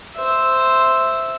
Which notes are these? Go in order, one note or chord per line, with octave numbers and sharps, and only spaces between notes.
C5 E5